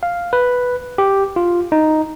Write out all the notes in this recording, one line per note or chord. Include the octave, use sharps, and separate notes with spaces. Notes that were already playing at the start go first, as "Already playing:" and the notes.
F5
B4
G4
F4
D#4